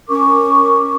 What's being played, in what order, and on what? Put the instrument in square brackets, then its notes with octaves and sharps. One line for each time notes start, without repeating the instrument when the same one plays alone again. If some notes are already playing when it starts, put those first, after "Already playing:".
[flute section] C#4 A#4 C#6 D6